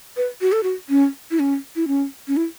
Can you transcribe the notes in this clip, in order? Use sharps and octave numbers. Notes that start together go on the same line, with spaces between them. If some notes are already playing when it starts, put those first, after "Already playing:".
B4
F#4
A4
F#4
C#4
E4
C#4
E4
C#4
C#4
E4